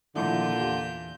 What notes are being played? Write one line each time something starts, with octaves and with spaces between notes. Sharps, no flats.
A#2 D3 D#3 F3 E4 F4 G6
E2 G4